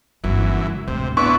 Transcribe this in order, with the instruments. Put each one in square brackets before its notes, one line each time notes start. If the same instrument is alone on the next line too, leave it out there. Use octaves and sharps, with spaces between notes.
[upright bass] G1 [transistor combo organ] F#2 E3
[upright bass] C#2
[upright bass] D1 G#1 [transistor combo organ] C3
[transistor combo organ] B3 D4 E4 [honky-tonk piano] C#6